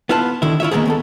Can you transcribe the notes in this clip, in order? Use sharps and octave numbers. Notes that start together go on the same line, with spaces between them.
B3 E4 F4 B4 A5
D3 D#3 E4
E4 F4 C#5 E5
D#3 G#3 A#3 B3 G#4
D#2 B3 A4